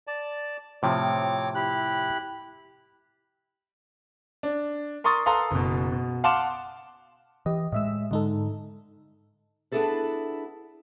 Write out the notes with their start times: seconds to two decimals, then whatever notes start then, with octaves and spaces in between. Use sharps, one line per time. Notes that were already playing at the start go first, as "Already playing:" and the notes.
0.07 D5 A5
0.83 A2 C3 F3 C4 C#5 D6
1.55 E4 G4 F#6
4.43 D4
5.04 A#4 C6 C#6 D#6 A6
5.26 A4 B4 F5 A#5 C6 D#6
5.51 F#1 B2
5.92 B2
6.24 F5 F#5 A5 C6 D6 E7
7.46 E3 G4 D#5
7.72 A2 G#3 D#5 E5 E6
8.11 G#2 D3 G#3 D#4 A4
9.72 B3 D4 E4 G#4 A4 B4